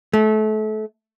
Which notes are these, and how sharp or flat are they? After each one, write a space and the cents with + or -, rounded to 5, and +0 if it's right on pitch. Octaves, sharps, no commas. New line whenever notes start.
A3 -30